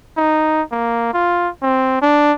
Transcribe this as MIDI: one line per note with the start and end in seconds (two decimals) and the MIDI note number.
0.17 0.62 63
0.72 1.12 58
1.13 1.48 65
1.62 1.97 60
2.02 2.33 62